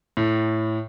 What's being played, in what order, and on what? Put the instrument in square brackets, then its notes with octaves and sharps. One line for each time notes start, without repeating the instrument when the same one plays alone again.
[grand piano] A2